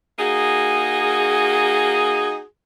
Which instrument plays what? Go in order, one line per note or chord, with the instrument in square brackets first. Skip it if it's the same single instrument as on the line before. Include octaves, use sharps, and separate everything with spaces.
[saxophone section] A#3 D#4 F#4 G#4